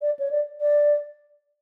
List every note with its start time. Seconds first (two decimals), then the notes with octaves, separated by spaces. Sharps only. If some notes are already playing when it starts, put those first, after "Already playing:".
0.02 D5
0.19 C#5
0.31 D5
0.61 D5